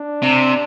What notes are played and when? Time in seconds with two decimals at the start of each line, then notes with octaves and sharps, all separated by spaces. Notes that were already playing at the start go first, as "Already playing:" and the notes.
Already playing: D4
0.22 C3